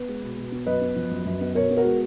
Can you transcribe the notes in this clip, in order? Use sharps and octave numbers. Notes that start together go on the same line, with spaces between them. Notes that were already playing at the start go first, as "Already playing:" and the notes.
Already playing: B3 B4
G#3
B2
B2
B3
F#2 B4 D#5
B3
F3
F#2
F#2
B3
B2 A#4 C#5
B3
F#4 A#4
G#3